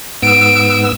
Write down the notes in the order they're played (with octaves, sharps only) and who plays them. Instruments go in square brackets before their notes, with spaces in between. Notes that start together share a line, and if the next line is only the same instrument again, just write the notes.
[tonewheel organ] G#2 B3 E6 [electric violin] D7